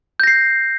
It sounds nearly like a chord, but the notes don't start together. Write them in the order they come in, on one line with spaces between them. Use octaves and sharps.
G6 A#6 C7